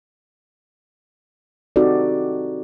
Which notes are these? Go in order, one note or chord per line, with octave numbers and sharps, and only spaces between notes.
C4 D#4 F#4 G4 A4 D5